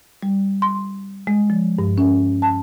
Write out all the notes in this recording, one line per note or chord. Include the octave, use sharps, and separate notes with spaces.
G3
C6
G#3
F3
G2
C#4
A5